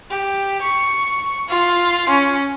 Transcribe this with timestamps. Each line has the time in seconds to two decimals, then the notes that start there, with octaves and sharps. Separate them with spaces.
0.10 G4
0.62 C#6
1.49 F4
2.09 C#4